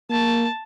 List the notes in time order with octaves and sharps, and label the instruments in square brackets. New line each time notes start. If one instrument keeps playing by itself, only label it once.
[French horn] A#3 [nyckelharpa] A5